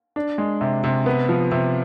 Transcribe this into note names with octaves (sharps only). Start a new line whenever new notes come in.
D4
G#3
C3
C3
B3
F3
C3